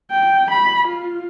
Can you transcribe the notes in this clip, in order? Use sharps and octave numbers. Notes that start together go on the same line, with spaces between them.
G5
B5
F4